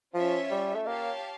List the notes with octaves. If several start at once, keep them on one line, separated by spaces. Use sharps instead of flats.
F3 C#4 F4 C#5 E5
G3
A3
A#3 G4 C#5 F5 A5